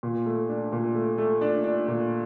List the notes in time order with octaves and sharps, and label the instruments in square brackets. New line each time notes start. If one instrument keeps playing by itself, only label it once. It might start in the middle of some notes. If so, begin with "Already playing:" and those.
[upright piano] A#2
A3
D4
A#2
A3
A3
D4
D4
A#2